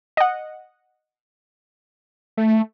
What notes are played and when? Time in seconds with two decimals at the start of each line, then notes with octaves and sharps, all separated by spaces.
0.17 D#5 F#5
2.37 A3